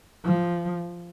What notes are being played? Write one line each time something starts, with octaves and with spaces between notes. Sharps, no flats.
F3